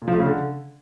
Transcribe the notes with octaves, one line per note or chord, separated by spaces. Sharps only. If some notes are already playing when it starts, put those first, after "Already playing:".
A#2
F3
A3
C#3
D3